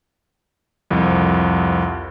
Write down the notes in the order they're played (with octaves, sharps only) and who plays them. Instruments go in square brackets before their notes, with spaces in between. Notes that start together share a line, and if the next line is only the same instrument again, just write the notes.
[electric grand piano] C2 F2